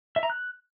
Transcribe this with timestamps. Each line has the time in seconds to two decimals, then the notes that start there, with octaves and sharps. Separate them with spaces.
0.16 E5
0.23 A#5
0.30 F#6